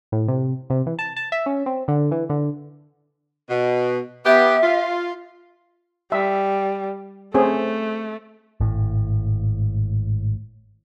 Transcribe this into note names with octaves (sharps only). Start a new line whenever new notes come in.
A2
C3
C3
E3
A5
A5
E5
C#4
C4
D3
E3
D3
B2
B3 G4 E5
F4
G3 E5
A3 C4 C#4 G#4
G#1 A2